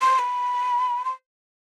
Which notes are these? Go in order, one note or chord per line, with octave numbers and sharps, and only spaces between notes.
C6
B5
C6